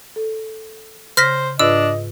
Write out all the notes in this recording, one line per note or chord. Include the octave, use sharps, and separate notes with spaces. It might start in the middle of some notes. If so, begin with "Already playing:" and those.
A4
C#3 C5 F6 A#6 B6
G#2 D4 F4 B4 D#5 E6